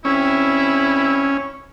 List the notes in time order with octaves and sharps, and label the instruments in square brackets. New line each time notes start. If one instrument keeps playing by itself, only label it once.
[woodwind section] D2 C4 E4 [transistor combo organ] C#4